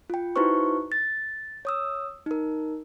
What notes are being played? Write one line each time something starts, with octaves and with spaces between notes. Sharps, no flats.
F4 G5
D#4 E4 F#4 B4 C5 C#6
A6
C#5 D#6 E6
D#4 A#4